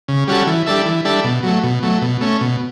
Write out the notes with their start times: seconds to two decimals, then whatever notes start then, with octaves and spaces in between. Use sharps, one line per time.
0.08 C#3
0.28 G3 C#4 F#4 A4
0.47 E3
0.66 G3 D4 A4 E5
0.85 E3
1.05 G3 D4 A4 E5
1.24 B2
1.43 F#3 A3
1.63 B2
1.83 F#3 A3
2.02 B2
2.21 A3 C#4
2.41 B2